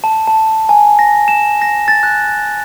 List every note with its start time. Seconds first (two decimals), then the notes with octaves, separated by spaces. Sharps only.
0.04 A5
0.27 A5
0.69 G#5
0.99 A#6
1.28 E7
1.62 A#6
1.88 A6
2.03 F#6